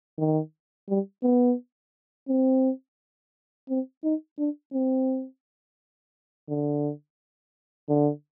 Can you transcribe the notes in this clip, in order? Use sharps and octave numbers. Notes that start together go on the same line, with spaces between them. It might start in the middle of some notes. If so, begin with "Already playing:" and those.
D#3
G3
B3
C4
C4
D#4
D4
C4
D3
D3